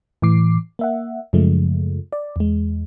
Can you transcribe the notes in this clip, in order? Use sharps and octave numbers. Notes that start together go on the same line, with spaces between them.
A2 E3 D6 C7
A#3 E5 F#5
F#2 C#3 F3 G#3 A3
D5
E2 G#3